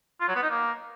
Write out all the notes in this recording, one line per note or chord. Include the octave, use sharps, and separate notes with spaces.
F4
F#3
B3
D#4
A#3